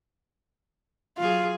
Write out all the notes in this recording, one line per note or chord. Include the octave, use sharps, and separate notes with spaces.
F#3 F4 G#4